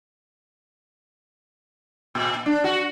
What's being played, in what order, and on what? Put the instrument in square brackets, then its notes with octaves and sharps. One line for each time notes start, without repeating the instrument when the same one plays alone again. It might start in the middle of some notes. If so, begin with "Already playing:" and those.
[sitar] A#2
D4
F#4